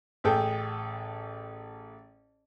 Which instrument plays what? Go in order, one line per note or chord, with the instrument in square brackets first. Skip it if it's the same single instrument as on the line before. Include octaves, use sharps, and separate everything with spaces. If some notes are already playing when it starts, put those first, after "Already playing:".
[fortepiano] A1 G#4 A4 G5